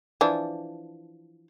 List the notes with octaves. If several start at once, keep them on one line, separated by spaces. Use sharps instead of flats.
E3 F3 D4